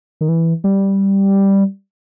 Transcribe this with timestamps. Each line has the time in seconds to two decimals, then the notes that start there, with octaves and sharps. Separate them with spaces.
0.21 D#3
0.29 E3
0.64 G3